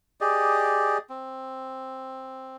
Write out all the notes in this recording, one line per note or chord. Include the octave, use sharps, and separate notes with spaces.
G4 G#4 D5 D#5
C4